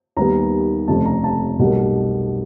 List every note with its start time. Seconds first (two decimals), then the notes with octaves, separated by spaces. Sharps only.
0.16 D#2 D#3 G3 B3 A#5
0.88 F1 F2 C#3 A5
1.05 A#5
1.24 A5
1.59 B1 B2 G3 A#3